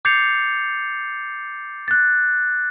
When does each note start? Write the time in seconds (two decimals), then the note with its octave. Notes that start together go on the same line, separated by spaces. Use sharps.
0.05 D6 G6 A6 C7 C#7 F7
1.88 F#6 A6